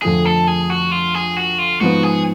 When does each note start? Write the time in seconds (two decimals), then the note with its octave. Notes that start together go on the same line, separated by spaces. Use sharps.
0.02 F2 D3 F3 A3 G#4
0.25 A4
0.48 G#4
0.70 F#4
0.92 F4
1.15 G#4
1.37 F#4
1.59 F4
1.81 G#2 F3 B3 F#4
2.03 G#4